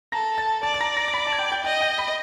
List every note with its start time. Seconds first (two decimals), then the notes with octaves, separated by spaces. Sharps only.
0.12 A4 A#5 A#6
0.38 A5 A6
0.63 D5 A5 A6
0.74 A6
0.80 A#5 A#6
0.96 A#5 A#6
1.08 A#6
1.13 B5 B6
1.27 A5 A6
1.33 G#6
1.39 G5 G6
1.52 G5 G6
1.64 D#5 G5 G6
1.81 G5 G6
1.98 B5 B6